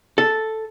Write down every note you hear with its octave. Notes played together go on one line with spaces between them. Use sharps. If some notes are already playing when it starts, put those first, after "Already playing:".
A4